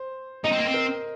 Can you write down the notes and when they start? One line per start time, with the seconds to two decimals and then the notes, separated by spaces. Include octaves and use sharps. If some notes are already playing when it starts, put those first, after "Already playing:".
Already playing: C5
0.44 D#4 D#5
0.52 C4
0.58 A#3
0.65 C4
0.74 A#4